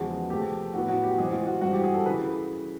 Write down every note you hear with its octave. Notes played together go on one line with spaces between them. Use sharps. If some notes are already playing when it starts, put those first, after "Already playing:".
Already playing: E2 C#3 F3 G#3 B3 F#4
C3 F3 A3 G4
A2 F#3 B3 F#4
F#4
G4
C3 E3 G#3 C4 G#4
F#4
F4
F#4
G2 E3 G#3 C4 F#4
G4
G#4
A4
C#3 E3 B4